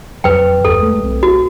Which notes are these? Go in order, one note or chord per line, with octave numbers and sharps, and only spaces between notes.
F2 F#3 B4 G5
D1 G1 E2 A4
G#3 A3
B1 C4
F#4